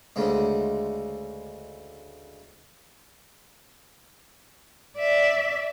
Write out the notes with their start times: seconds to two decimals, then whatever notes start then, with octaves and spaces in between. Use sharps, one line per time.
0.16 D2 C#3 G#3
4.98 D5 E5